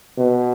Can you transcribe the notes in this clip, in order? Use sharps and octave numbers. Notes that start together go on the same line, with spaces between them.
B2